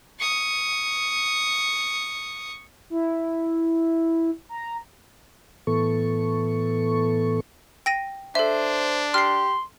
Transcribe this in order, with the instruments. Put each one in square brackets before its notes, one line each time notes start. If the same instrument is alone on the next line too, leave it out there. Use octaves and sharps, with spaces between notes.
[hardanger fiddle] C#6 D#6
[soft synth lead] E4
A#5
[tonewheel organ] A2 E3 B3 A4 C#6
[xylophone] G5 A#6 D#7
[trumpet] D4 [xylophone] A4 E5 [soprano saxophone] C5
[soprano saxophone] G4 [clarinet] C6 [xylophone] F6 C7